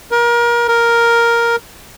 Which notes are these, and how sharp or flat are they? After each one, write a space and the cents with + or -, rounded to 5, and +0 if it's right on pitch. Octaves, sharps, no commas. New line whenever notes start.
A#4 +30
A#4 +5